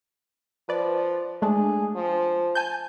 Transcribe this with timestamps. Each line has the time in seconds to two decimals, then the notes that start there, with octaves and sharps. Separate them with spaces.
0.69 F3 B4 D5
1.42 G#3 A3 D4 G#4
1.96 F3
2.55 G#5 A5 G6